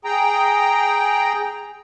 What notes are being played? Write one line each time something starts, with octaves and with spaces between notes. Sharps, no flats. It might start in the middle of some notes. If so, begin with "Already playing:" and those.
G#4 G5 A#5